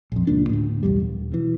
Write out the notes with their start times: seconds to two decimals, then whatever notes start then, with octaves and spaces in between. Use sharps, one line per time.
0.12 A#1 F2
0.27 F1 C#2 A#2 D4
0.49 D2 A2
0.83 B1 E2 G3
1.00 D#1
1.32 B2 E3